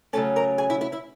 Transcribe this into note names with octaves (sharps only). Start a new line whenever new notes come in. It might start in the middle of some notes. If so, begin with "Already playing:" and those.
C#3 F#3 A3 C#4 A4 A5
A#4 A#5
G#4 G#5
E4 E5
E4 E5
E4 E5